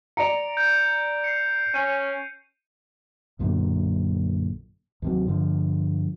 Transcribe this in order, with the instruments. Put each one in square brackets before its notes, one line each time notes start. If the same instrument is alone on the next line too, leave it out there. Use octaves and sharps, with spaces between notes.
[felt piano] D5 A#5 [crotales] C#7 D7 F7
[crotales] G6
C7 C#7
[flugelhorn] C#4 [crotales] C#7 D#7
[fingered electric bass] B1 F#2 A#2 D3
D#2 C3 F#3
G2 D3 F3